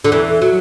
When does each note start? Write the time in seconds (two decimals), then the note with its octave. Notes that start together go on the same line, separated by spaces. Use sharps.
0.04 D3
0.12 E2 E3
0.42 F#3